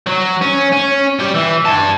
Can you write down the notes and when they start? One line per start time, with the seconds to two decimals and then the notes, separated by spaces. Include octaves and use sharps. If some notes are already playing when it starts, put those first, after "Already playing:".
0.06 F#3
0.42 C#4
0.73 C#4
1.19 G3 G4
1.34 E3
1.65 G4 A5